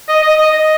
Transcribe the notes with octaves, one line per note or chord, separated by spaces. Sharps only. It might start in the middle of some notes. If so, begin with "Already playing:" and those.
D#5
D#5
D#5
D#5